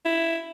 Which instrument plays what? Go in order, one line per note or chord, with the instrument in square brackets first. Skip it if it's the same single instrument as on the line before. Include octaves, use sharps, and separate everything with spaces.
[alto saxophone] E4